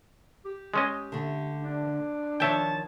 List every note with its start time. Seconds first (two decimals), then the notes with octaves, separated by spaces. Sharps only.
0.45 G4
0.74 G#3 C#4 D#5
1.12 D3 A3
1.64 D4
2.40 D#3 F3 C#5 E5 G5 A5